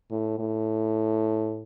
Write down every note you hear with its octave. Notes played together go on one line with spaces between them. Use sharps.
A2
A2